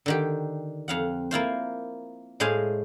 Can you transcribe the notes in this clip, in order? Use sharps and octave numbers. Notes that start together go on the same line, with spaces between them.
D3 D#3 G4
F2 F5 F#5
A#3 E4 F4 C5
A2 G#3 C5 F5 G#5